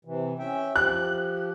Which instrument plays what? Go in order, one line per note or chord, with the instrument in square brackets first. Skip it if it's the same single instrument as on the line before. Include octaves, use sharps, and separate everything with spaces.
[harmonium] C3 E3
C#4 E5 G5
[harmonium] F3 G4 [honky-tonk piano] F#6